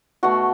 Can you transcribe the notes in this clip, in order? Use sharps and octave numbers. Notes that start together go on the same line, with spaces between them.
B2 A3 F#4